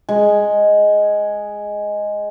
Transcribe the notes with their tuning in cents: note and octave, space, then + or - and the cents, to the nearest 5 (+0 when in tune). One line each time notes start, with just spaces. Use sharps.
G#3 +0